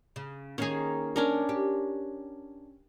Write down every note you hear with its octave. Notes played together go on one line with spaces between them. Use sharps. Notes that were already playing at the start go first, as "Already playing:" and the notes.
C#3
D#3 A#3 C#4 G#4
C#4 D4 A#4
G4